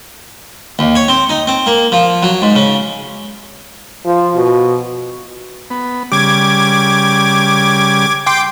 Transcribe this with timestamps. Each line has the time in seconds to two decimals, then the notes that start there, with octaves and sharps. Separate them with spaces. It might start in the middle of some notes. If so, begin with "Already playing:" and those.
0.79 D#2
0.95 C#5
1.08 C4
1.29 D#4
1.47 C4
1.67 A#3
1.92 F3
2.23 F#3
2.42 G#2
2.56 C#3
4.06 F3
4.36 B2
5.70 B3
6.12 C#3 G3 D6 G#6
8.26 G5 C6 D6